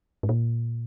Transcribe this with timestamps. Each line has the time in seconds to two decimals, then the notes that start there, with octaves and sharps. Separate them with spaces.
0.23 G#2
0.29 A#2